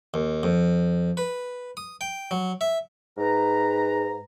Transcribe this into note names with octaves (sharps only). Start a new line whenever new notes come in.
D#2
F2
B4
D#6
G5
F#3
E5
G#2 B4 A#5